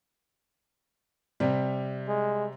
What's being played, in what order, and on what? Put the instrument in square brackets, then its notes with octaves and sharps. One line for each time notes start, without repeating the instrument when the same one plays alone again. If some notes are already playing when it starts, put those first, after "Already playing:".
[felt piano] C3 G3
[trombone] G#3